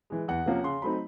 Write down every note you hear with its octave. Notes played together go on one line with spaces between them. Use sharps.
E3 G#3
E2 F#5
C3 F3 A#3 C#4
C#3 C6
F#3 A3 C4 D#4 B5